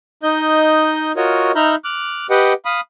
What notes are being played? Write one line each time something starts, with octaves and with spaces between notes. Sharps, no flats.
D#4 D#5 G6
F4 F#4 A#4 C#5 D#5
D#4 E5 A#5 B5 F6 G6
D6 F6 F#6
G4 B4 D#5 F#5 G5
F5 B5 D#6